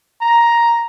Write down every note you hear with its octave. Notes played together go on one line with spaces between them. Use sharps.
A#5